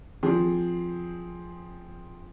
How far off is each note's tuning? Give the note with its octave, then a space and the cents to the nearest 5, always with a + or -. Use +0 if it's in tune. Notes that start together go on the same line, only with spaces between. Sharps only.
F3 +0 C4 +0 G#4 +0